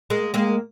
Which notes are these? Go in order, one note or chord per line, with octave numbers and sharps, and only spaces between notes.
G#3 A#3
G#3 A#3